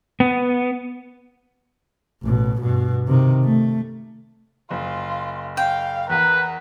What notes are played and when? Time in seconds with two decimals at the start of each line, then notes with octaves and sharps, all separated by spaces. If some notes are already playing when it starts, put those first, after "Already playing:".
0.20 B3
2.23 A1 B2
2.61 G2 B2
3.07 C3 D#3
3.44 A3
4.71 F#1 F4
5.57 F5 G5
6.10 E2 A#4 B4